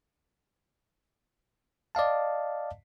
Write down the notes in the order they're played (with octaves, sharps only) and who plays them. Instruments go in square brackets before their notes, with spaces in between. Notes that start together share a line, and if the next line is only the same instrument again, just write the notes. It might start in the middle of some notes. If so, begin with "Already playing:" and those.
[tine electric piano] D5 D#5 F5 A5